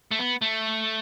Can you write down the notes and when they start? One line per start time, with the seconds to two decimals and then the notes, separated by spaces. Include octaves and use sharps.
0.11 A3
0.19 B3
0.42 A3